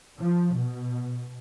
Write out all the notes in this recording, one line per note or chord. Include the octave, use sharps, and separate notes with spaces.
F3
B2